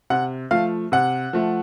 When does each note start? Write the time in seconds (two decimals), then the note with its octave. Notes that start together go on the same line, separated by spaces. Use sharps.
0.10 C3 F#5
0.51 F3 A3 F5
0.92 C3 F#5
1.33 F3 A3